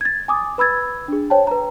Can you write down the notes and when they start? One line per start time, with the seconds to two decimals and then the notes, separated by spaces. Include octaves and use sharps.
0.01 G#6 A6
0.28 G#5 D6 D#6
0.58 B4 B5 E6 G#6 A6
1.08 D4 G#4
1.30 C5 C#5 G5 A5
1.47 B4 A#5